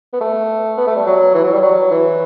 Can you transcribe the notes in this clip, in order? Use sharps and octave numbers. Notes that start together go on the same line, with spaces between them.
B3
A3
B3
A3
G3
F#3
E3
F#3
G3
F#3
E3